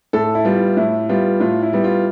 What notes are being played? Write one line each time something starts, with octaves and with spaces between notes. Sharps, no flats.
A2 A4
E4
G3 B3 F4
A2 E4
G3 B3 F4
A2 F4
E4
G3 B3
F4